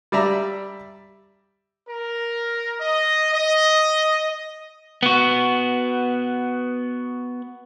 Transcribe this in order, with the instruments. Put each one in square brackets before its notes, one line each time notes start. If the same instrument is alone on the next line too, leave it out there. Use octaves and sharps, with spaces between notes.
[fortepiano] G3 D5 E5 A#5
[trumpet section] A#4
D#5
D#5
[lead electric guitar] B3 F#4